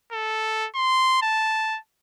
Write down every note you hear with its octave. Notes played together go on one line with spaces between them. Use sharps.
A4
C6
A5